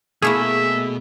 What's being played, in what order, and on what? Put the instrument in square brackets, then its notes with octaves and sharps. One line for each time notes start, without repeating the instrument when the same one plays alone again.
[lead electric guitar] B2 [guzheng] A3 A#3 E4 [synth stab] G#4 [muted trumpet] E5